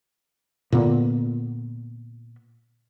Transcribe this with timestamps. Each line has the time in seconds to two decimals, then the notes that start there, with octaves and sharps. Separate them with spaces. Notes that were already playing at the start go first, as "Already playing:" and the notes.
0.72 A#2 D3 B3